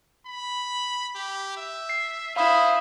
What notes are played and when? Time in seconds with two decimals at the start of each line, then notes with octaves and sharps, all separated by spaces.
0.26 B5
1.15 G4
1.57 E5
1.89 C7
2.36 E4 C5 F5 B5 D#6